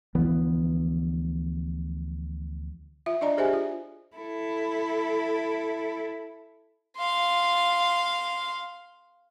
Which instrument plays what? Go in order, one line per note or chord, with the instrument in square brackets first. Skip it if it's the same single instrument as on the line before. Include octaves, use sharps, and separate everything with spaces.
[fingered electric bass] D2 E3 F3 B3
[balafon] F4 E5
D4 D5 D#5 A#5
G4 G#4 C5 D#5 E5 G#5
F4
[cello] E4 A4
[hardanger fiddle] F5 C6